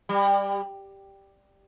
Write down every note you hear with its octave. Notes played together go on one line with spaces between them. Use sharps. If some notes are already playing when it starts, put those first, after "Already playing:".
G3